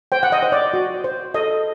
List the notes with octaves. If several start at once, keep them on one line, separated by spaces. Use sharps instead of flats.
C5 G5
F#5
D#5
C5
D5
F#4
C5
A4 D#5